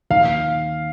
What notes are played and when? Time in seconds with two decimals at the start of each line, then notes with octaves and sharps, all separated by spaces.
0.10 D#2 D#3 A#3 F5